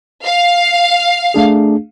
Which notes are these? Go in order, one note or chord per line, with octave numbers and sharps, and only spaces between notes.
F5
A3 D4 G#4